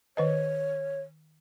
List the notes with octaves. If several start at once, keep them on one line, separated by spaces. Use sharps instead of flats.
D#3 B4 C#5 D#5